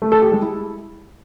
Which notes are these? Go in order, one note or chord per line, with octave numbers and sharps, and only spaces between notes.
A3
A4
G4
G#3
E4